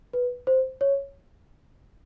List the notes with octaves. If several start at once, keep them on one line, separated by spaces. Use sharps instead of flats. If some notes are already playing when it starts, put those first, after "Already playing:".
B4
C5
C#5